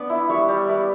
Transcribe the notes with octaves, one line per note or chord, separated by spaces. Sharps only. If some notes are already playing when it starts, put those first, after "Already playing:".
Already playing: B3 D4 B4 D5
E4
G3 C#5 E5
G3
E4 B4 D5